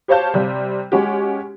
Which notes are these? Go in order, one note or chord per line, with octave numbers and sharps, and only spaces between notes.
G4 C5 C#5 F5 A5 G6
C3 G3
G#3 C#4 F#4 G4